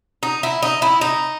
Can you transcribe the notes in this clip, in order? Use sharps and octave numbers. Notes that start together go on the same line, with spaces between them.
D#4
E4
D#4
E4
D#4